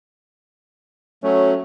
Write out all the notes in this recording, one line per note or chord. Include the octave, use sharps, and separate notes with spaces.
F#3 A3 C#4